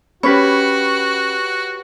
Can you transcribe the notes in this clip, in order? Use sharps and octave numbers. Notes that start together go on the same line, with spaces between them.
C#4 F#4 G4 B4 C#5 B5 C#6 B6